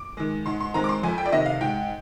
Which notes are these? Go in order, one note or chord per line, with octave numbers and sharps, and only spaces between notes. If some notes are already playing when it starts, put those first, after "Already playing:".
Already playing: D6
D#3 G#3
G#2 C6
C6
D#3 G#3 C4 A#5
D6
C6
F2 G#5
G5
D5
C3 D#3 D#5
F5
G#2 G5